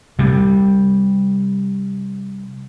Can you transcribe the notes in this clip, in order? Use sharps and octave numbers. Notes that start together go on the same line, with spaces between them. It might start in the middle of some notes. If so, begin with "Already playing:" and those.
C3 G3